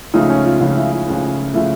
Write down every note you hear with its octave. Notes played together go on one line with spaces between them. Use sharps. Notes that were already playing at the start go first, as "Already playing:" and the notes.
C#2 C#3 F3 A3 D#4
C#4
F4
C#2 C#3 F3 A3 F4
E4
E4
C#2 C#3 F3 A3
C#3 F3 A3 E4